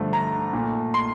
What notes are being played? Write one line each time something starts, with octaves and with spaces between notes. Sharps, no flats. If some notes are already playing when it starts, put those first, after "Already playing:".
Already playing: G2 D3 F3 A3
A#5
A#2 A3
C6